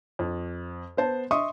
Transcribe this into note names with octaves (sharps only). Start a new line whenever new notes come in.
F2
B3 C5 A5
D#5 E5 C6 C#6 D#6